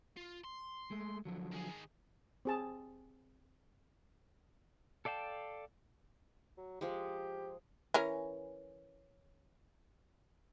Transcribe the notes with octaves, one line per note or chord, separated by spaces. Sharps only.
F4
C6
G#3 A3
D3 F3 F#3
D#3 G#4
C4 G#4 A5
A4 D5 F5 G5 A5
F#3
F3 G#3 G4
E3 C#4 A#4